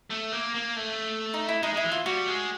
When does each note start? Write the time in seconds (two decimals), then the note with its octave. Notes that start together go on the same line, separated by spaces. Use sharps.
0.10 A3
0.32 A#3
0.55 A#3
0.76 A3
1.34 D#4
1.49 E4
1.63 G#3 D#4
1.74 G#3 E4
1.84 E3
1.92 F4
2.06 G3 F#4
2.27 G#3